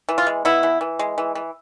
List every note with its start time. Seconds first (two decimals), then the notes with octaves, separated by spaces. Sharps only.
0.09 E3
0.18 F4
0.27 G#3
0.45 B3 E4
0.63 E3
0.81 E3
0.99 G#3
1.18 E3
1.35 E3